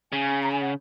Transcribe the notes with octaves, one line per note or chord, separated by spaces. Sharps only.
C#3 G#5
A#5
G#5
F#5